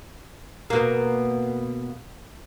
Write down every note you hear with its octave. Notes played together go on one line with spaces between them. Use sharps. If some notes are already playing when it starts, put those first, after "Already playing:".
B2 A#3